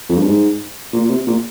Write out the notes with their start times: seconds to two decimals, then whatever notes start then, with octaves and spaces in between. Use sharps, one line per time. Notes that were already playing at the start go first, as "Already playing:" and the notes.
0.09 F2
0.18 G2
0.26 G#2
0.93 A#2
1.05 A#2
1.10 C3
1.27 A#2